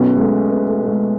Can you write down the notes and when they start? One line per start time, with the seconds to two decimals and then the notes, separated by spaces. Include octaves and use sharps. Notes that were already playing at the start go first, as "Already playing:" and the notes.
Already playing: B1 B2 F#3 B3 C#4
0.16 G#3
0.20 A3
0.49 B3
0.69 A3
0.82 A3
0.88 G#3